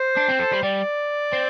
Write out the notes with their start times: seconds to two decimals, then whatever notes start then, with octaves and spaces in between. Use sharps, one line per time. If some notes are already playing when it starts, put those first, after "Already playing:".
Already playing: C5
0.17 D4
0.28 C4
0.39 A4
0.52 G3
0.63 G3 D5
1.33 C4